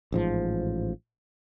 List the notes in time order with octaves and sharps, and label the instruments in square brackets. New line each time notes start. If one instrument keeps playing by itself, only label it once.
[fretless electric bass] A1 G#2 F3